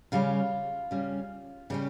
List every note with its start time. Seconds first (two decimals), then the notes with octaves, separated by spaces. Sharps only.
0.12 C#3 G3 C#4 F4
0.91 C#3 G3 C#4
1.70 C#3 G3 C#4 G4